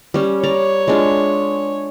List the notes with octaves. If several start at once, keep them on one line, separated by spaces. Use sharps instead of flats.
G3 C#4
C#5 D5 A#5
G#3 D4 F4